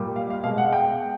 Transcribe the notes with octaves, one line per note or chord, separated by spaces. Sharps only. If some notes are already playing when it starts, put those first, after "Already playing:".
Already playing: A#2 G3 A#3
F5
F5
B2 G#3 F5
F#5
G5